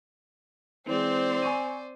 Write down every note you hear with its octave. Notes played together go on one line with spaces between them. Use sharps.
E3 G#3 C4 C5 D5
G#5 C#6 D#7